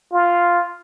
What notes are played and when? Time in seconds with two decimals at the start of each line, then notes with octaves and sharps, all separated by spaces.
0.12 F4